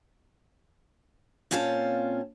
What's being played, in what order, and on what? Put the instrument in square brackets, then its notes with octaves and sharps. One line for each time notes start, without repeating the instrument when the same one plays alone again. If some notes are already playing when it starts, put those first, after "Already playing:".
[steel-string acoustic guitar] A#2 C4 C#4 F4 C#5 A5